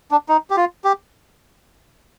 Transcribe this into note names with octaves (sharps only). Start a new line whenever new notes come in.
D4
D#4
G4
F4
G4